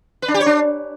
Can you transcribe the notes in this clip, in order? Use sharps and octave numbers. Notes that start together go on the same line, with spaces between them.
B4
D4
G4
C#5
D4